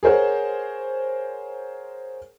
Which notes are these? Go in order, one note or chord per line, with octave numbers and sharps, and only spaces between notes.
G#4 A#4 C5 C#5 F#5